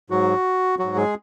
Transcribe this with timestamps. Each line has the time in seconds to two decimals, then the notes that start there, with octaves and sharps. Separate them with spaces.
0.10 G#2 F#3 F#4
0.79 G#2 F#3 F#4
0.96 G#3 G#4